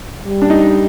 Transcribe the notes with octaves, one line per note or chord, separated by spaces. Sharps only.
G3
D4
D#4